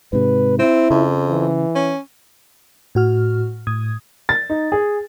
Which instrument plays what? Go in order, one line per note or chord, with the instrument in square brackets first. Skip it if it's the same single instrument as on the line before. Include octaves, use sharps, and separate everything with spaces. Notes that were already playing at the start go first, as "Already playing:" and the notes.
[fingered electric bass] G#2 C3 [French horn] B4
[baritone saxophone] C4 [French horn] E4
[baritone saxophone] F2 [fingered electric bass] C#3
[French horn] E3
[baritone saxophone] C#4
[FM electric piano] A2 F#4 F6
A2 D#6 G#6
[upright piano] A6
D#4
G#4